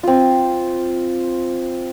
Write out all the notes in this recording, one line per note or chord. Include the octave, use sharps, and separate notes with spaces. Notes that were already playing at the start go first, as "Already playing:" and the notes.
C4 F4